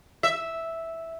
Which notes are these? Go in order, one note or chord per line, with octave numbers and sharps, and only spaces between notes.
E5